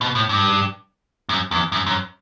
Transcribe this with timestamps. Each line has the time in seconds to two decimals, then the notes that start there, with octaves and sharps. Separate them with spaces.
0.01 B2
0.15 A2
0.29 G2
1.29 F#2
1.51 E2
1.72 F#2
1.86 F#2